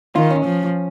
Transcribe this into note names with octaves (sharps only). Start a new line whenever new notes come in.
D#3 F4
C#4
F3